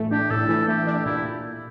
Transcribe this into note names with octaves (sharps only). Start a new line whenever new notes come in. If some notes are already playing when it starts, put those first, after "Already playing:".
Already playing: A2 E3 A3
D4 G4
A2 A4
E3
A3 G4
D4
A#2 E4